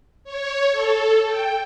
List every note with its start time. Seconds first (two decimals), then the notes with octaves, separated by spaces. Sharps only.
0.24 C#5
0.71 A4
1.26 G5